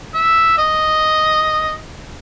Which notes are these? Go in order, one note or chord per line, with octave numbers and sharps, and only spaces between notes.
E5
D#5